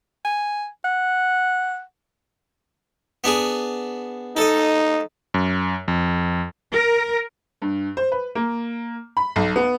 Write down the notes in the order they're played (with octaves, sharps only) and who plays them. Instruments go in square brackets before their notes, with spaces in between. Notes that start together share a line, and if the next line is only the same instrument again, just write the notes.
[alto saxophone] G#5
F#5
[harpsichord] B3 D4 G#4
[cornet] D#4 [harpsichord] A4 D#5
[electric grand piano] F#2
F2
[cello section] A#4
[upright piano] G2
C5
B4
A#3
B5
B1
B3